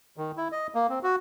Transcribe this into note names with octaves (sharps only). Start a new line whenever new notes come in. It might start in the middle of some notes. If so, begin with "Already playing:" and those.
D#3
E4
D#5
A#3
C4
F#4